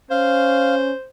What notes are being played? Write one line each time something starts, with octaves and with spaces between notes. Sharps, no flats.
C#4 C5 F5